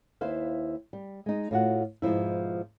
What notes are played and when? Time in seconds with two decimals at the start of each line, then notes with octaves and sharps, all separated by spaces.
0.21 D#2 E4 B4 C5 F5
0.93 G3
1.26 G#3 D#4
1.51 A2 F4 F#4 F#5
2.02 G#2 B2 F3 E4